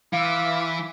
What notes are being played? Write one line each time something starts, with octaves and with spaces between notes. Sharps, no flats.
E3 F4 E5 F5 D6